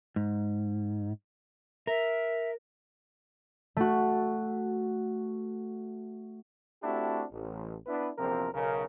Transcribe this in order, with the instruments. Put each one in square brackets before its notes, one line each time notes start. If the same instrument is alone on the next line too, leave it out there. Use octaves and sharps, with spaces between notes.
[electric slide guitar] G#2
[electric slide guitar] A#4 [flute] E5
[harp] A3 F#4
[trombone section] A3 C4 D4 E4 F#4 G4
A1
B3 D4 E4 B4
A#1 E2 C3 F3 C4 A#4
B1 C#3 A#4